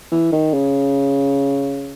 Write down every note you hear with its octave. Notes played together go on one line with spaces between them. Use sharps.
E3
D#3
C#3